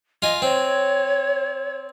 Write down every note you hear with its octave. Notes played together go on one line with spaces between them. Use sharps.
F4 D#5 G#5
C4 C#5